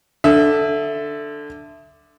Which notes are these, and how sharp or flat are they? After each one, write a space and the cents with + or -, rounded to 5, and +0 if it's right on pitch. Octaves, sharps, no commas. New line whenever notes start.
D3 +0 E5 +5 D#6 +35